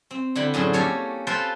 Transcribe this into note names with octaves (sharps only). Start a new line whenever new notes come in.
C4
D3 E4 G5 B5
F#2 A2 G#4 C5 C6
A#3 C#4 G4 A4 C#5 G#5
F4 A4 B4 C5 G5